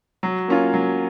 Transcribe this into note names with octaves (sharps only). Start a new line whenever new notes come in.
F#3
A#3 C#4 F4
F#3